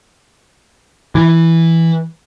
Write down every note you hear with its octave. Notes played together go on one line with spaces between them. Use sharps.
E3